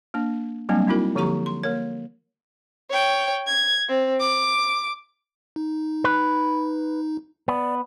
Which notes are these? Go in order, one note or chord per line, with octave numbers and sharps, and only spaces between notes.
A#3 D4
F#3 G3 A#3 C4 D4
C4 D#4 E4 F#4 A#4
D3 F3 A#3 G4 A#5 C#6
C6
A#3 A#4 C#5
C#5 G5
G#6
C4
D6
D#4
B4
B3 D5